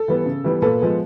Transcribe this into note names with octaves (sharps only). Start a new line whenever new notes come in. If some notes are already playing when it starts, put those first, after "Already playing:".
Already playing: A4
E3 G3 B3
C#3
E3 G3 B3
A#2 A4 B4
F3 G#3 B3